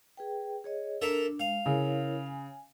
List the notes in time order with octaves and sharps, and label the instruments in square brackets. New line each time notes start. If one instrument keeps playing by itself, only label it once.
[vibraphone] G#4 B4 G5
G#4 C#5 D#5
[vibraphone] D4 [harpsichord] A4 A#4 E5
[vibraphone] G#3 [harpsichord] F5
[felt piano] C#3 [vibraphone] E4 A#4 C#5
[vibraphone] G#5